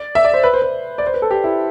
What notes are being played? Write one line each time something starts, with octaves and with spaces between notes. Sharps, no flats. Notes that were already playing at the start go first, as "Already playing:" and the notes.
Already playing: D5
E5
D5
C5
B4
C5
B4
D5
C5
B4
A4
G4
E4